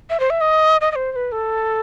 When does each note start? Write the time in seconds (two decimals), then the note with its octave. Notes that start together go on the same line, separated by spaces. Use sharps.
0.10 E5
0.20 C5
0.30 E5
0.41 D#5
0.81 D#5
0.92 D#5
0.96 C5
1.12 C5
1.16 B4
1.32 A4